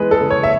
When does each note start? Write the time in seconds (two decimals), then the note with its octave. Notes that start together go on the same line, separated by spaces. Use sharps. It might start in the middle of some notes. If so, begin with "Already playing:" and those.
Already playing: E3 G#3 B3 B4
0.11 A4
0.21 C#3
0.30 C#5
0.43 E5